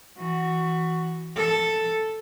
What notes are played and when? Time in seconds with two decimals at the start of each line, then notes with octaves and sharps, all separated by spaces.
0.17 E3 F#4
1.36 A4